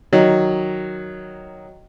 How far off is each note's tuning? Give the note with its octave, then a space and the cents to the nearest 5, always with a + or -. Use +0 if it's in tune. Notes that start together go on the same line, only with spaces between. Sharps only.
D#3 +0 F#3 +0 D#5 +0